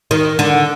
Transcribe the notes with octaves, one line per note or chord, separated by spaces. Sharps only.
D#3
D3